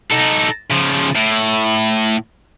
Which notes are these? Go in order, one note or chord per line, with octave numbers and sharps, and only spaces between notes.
D#4 A4
C#3 F3
A2